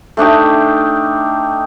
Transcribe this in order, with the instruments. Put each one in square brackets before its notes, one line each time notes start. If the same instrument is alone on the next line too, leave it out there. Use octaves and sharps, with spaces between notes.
[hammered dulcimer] A3 D4 D#4 G4